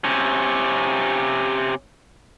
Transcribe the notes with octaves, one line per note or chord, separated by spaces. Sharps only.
C3 C#4